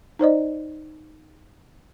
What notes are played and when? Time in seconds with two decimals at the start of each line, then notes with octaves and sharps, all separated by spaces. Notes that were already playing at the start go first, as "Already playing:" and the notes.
0.19 D#4 C5 D5 D#5